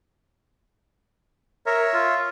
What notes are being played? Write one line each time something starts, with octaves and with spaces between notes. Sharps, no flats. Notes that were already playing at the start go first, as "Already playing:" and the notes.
A#4 C#5 E5
F4